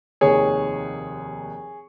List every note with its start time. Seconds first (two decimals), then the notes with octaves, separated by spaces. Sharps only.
0.21 F1 D#2 D#3 G#4 C#5